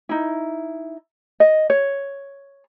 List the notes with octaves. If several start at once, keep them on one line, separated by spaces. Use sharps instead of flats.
D#4 E4
D#5
C#5